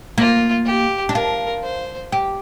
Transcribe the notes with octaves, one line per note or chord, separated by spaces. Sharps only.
A#3 F4
G4
D4
F4 A#4
C5
G4